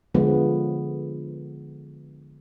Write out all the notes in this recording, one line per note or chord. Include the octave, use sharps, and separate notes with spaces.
D3 F3 G#3 B3